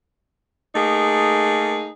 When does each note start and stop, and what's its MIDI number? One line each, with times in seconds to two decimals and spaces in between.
0.75 1.90 57
0.75 1.90 58
0.75 1.90 63
0.75 1.90 68